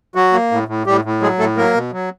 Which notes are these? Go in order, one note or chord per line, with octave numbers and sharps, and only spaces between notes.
F#3 F#4
A#3
A2
A2
A2 G3 G4
A2
F#3 G#3 G#4
A2 A3 A4
F#3 A#3 A#4
B2
F#3